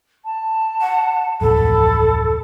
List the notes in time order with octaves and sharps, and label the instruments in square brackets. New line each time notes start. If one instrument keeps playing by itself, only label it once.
[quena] A5
[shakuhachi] F#5
[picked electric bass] D1 A1 F2 [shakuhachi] A4 [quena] B5